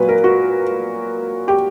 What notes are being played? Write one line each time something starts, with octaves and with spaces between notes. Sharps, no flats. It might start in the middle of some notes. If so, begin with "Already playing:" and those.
Already playing: A#2 F#3 B4
A#4
F#4
G4